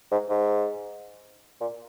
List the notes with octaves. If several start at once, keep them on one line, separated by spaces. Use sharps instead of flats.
G#2
G#2
A#2